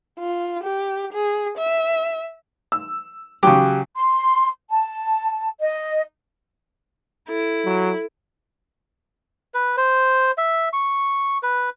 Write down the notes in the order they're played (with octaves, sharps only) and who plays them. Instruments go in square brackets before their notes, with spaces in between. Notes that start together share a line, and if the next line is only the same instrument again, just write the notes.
[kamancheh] F4
G4
G#4
E5
[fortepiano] E6
[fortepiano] C#3 F#3 [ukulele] G4
[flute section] C6
A5
D#5
[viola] E4 [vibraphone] A4
[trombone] F#3
[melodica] B4
C5
E5
C#6
B4